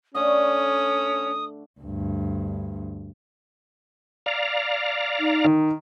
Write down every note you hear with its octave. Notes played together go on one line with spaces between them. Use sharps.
D3 A3 C#4 D4 D#6
D2 G2
D5 F5 A#5
D#4
D#3